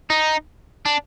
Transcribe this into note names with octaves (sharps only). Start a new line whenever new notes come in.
D#4
D4